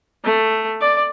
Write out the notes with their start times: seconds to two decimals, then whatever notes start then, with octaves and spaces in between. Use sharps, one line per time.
0.24 A3
0.81 D5